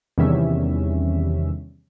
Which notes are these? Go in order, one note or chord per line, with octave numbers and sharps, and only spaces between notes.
E2 C3 D#3 G3 C#4 E5